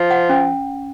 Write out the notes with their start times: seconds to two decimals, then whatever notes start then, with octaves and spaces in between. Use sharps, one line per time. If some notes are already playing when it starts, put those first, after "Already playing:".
Already playing: F3
0.11 F#5
0.29 C#4